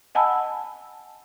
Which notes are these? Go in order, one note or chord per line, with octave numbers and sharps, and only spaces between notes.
D#5 F#5 G#5 A5 B5 E6